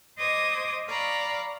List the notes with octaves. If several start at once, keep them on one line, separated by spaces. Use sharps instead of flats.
C5 D#5 D6 D#6 G#6
D5 F5 A#5 B5 C#6